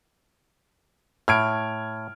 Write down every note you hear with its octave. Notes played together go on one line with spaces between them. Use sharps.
A2 F6 G#6 D7